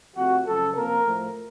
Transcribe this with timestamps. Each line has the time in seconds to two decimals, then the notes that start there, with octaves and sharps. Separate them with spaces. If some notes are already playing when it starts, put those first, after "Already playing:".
0.17 F2 C3 F3 A3 F#4
0.47 F#2 C#3 F3 A4
0.76 C3 F3 A#3 A#4
1.04 A2 F3 A3